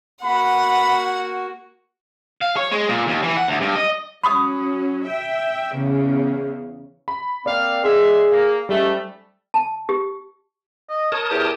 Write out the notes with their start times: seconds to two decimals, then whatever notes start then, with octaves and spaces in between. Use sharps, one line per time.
0.23 A#3 F#4 F#5 B5
2.41 F5
2.56 C#5
2.72 G#3
2.89 A#2
3.07 D#2
3.23 E3
3.37 F#5
3.48 D2
3.61 G2
3.76 D#5
4.24 F#3 C#4 B5 C#6 D#6
5.06 E5 G5
5.75 E2 C#3
7.08 B5
7.46 A#3 C4 D5 F5
7.84 G#2 G#4 E5 C6
8.31 A#3
8.69 G#2 G3 A3 C#4
9.54 A5
9.89 G4
10.90 D#5
11.12 A#4 C#5 A5 D#6
11.30 E2 G4